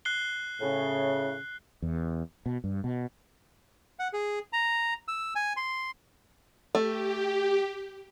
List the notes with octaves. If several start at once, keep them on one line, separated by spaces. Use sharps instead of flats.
F#6 C7 G7
A2 C#3
E2
B2
G2
B2
F#5
G#4
A#5
E6
G#5
C6
A3 G4